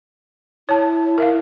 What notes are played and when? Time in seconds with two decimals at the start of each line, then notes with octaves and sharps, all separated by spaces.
0.69 E4 C#5 A5
1.18 A#4 E5 F5